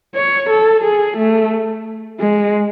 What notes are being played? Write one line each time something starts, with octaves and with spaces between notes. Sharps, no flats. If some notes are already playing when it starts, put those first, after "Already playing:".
C#5
A4
G#4
A3
G#3